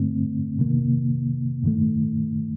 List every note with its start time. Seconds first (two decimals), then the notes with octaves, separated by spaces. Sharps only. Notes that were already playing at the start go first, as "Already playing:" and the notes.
Already playing: G2 D3 A3 C4
0.59 C3 D#3 A#3
1.64 G2 D#3 A3